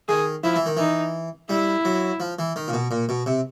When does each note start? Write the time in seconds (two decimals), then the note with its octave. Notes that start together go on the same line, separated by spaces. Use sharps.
0.08 D#3 G#4
0.44 F3 E4
0.56 E3
0.66 D#3
0.77 E3 D#4
1.49 G3 E4
1.85 F#3
2.20 F3
2.39 E3
2.56 D#3
2.68 A#2
2.73 B2
2.91 A#2
3.09 B2
3.26 C3